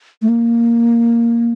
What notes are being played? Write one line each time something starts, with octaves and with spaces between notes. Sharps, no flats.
A3
A#3